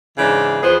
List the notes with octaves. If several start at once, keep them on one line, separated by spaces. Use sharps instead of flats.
G#2 C#3 E3 G#3 D4 E4
E2 F3 B3 G#4 B4 C5